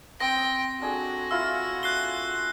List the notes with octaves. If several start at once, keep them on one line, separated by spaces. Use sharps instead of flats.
C4 G5 D#6 A#6
D4 F#4 G#4 A4
E4 F4 F5 E6
F#6 C7 G7